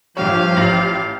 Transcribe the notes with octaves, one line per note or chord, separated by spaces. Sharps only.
A#1 G2 F3 G4 C#5 F5
A1 A#6 F#7